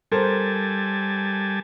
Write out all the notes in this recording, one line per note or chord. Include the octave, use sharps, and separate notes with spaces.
G3 A4 A#4 C5 G#5 A5